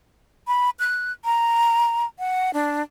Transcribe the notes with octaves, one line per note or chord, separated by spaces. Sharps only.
B5
F#6
A#5
F#5
D4